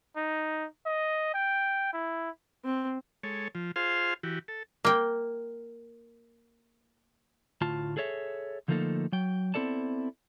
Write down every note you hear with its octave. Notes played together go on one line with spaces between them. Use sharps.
D#4
D#5
G5
E4
C4
G#3 A4 C#5
F3
F4 G#4 C5 F5 C6
E3 F#4 G4
A4
A#3 G5
D2 A2 F4 A5
G#4 A4 C#5 E5
D3 F3 A3 A#3 D#4 A4
F#3 G5
B3 C4 E4 A4 D5 A5